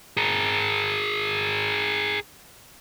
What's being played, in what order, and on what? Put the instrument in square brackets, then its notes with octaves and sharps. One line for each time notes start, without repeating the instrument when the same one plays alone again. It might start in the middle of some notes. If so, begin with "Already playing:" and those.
[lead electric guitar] G#4 A#4